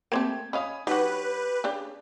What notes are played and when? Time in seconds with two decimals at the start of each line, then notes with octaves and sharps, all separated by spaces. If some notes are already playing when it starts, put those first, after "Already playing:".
0.12 A3 A#3 C4 G4 G5 G#6
0.53 C#4 D#5 F5 B5 D#6
0.87 F#3 D4 D#4 F#4 G4 B4
1.64 C#3 D4 G4